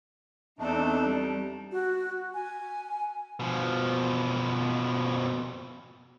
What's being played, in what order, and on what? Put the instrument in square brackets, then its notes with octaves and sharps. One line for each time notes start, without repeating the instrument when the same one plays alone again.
[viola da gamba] E2 C4 A4 [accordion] A3 D4 D#4
[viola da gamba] G3
[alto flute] F#4
G#5
[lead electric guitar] B2 F3